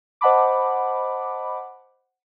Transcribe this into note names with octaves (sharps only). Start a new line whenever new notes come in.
C5 D#5 F#5 A5 B5 D6